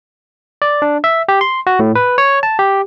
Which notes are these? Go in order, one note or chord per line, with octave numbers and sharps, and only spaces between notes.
D5
D4
E5
G4
C6
F#4
A2
B4
C#5
A5
G4